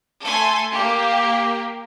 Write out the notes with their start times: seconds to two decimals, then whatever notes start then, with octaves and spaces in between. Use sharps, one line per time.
0.25 A3 A4 G#5 C6
0.72 A#3 G4